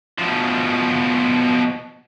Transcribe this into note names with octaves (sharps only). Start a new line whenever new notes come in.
B2 F3